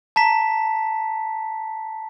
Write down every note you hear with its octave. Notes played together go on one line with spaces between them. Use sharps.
A5 A#5 B6